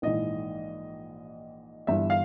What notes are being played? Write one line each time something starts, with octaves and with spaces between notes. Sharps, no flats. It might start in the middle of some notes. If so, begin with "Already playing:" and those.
A#1 G#2 E3 D#5
G1 G2 E3 E5
F5